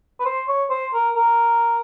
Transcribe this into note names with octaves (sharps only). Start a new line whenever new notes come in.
B4
C5
C#5
C5
A#4
A#4